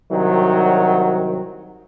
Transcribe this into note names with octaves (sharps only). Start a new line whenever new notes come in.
C2 D#3 F#3